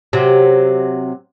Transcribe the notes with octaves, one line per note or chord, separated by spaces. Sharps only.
C3 F#3